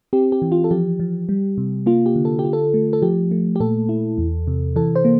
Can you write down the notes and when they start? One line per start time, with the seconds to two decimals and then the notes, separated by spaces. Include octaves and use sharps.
0.13 C4 G4
0.32 G4
0.42 E3
0.52 F4
0.64 A4
0.71 F3 G4
1.00 F3
1.29 G3
1.58 C3
1.86 A#3 F4
2.06 G4
2.16 D3
2.25 A4
2.39 G4
2.44 F4
2.53 A4
2.74 A3
2.93 A4
3.02 F3 G4
3.31 A3
3.56 G4
3.60 A#2 A4
3.89 E4
4.18 E2
4.47 C3
4.76 E3 A4
4.95 C5
5.05 A#3